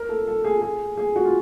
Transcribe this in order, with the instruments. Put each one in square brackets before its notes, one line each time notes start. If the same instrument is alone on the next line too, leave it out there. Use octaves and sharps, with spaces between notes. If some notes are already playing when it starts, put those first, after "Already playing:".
Already playing: [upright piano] A#4
A4
A4
G#4
G#4
G#4
F#4
F4